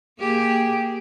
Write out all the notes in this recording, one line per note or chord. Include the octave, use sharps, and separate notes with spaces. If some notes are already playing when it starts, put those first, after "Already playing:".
A#3 G4 G#4